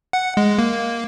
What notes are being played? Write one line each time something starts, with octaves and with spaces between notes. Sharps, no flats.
F#5
G#3
A#3